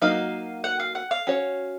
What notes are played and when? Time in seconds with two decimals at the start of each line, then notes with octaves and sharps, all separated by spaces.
0.01 F#3 A#3 D#4 F#4 F5
0.64 F#5
0.80 F5
0.95 F#5
1.11 F5
1.27 C#4 F#4 C#5